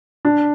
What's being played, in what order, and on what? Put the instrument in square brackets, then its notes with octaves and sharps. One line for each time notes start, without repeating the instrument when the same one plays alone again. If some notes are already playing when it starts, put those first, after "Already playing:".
[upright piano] D4